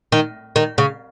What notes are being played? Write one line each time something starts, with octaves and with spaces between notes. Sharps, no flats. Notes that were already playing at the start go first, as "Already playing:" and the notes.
D#3
D#3
C#3